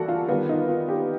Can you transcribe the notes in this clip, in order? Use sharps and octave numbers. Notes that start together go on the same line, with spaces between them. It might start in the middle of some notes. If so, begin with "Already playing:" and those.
Already playing: E3 G3 A#3 F#4 A4
F4
D#3 G3 B3 F4
D#4
F4
G4